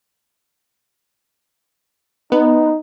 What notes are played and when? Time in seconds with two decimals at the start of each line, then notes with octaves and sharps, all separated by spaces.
2.32 B3 D#4